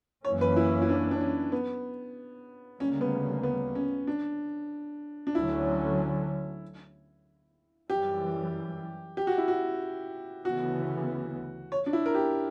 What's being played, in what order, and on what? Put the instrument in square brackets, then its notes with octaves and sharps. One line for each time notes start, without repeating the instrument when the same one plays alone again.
[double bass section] F#2 E3 A#3 C#4 [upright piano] C#5
[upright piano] B4
E4
E4
D4
D4
C#4
B3
[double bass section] D2 C#3 G3 A#3 [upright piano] C#4
[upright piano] B3
B3
C#4
D4
D4
[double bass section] D2 D3 F#3 C#4 [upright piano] E4
[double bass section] F#2 E3 G3 [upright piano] G4
[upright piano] G4
F#4
E4
F#4
[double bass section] D2 C#3 E3 B3 [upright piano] F#4
[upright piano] C#5
D4
E4
A#4
G4